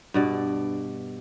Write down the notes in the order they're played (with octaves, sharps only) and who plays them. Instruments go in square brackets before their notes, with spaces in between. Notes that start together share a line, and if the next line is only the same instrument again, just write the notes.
[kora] G2 B2 D5